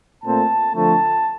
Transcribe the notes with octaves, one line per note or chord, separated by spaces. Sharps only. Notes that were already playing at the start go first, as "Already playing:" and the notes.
A#2 A3 C4 A5
D3 F3 A3 C4 A5